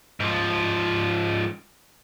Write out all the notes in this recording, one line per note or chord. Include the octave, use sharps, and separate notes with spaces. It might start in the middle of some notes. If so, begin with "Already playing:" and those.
G#2 F3